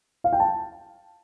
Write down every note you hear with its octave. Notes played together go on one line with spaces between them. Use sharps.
F5
G5
A5